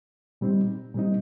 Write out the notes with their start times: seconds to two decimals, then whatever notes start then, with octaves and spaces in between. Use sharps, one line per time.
0.41 A#2 G3 C4 D#4
0.94 A#2 G3 C4 D#4